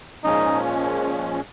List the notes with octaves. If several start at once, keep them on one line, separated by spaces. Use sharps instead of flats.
A#2 F3 G#3 C#4 D#4